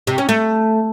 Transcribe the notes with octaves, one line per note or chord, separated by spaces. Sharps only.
C3
C#4
A3